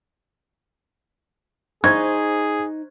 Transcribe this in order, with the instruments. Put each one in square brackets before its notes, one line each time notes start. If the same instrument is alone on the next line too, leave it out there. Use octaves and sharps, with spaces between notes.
[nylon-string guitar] D#4 [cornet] G#4 [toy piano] C5 C6 C#6 [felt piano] G#6